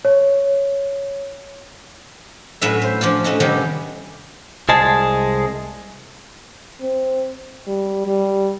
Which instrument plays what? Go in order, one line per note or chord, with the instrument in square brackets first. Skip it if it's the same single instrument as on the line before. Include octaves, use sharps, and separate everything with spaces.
[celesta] C#5
[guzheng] A2 F#3 C#4 B4 E5
C5
F3 C#4 D4 F4
A3 C#4 D#4 F#4
C3 D#3 G3 B3 C#4 G4
[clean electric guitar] C2 G#3 G#4 A5
[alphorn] C4
G3
G3